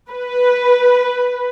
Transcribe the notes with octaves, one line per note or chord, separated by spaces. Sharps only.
B4